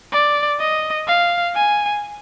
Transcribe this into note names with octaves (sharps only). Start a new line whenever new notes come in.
D5
D#5
F5
G#5